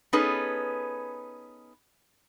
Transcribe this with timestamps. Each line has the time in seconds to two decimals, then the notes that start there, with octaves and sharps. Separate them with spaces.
0.13 B3 C#4 D#4 G#4 A4 B4